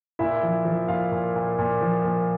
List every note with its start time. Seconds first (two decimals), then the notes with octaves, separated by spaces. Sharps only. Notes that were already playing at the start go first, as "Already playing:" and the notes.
0.19 A#2 E4 E5
0.43 F3
0.65 F3
0.88 A#2 F4 F5
1.12 A#2
1.36 A#2
1.59 A#2
1.81 F3
2.04 A#2